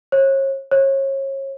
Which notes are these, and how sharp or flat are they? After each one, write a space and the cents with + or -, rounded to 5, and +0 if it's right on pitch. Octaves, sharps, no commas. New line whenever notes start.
C#5 -35
C#5 -30